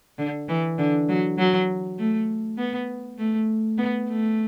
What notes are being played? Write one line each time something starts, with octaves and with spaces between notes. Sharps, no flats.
D3
E3
D3
F#3
F#3
A3
B3
A3
B3
A3